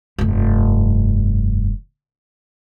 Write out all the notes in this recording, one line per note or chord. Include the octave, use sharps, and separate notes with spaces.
F1 G2